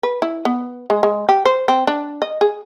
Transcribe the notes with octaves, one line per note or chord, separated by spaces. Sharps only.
B4
E4
B3
G#3
G#3
G4
C5
C4
D4
D#5
G#4